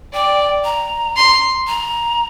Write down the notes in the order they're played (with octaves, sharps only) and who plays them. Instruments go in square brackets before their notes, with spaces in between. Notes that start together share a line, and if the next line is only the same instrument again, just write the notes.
[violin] D5 [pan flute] G5
[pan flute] A#5
[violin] C6
[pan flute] A#5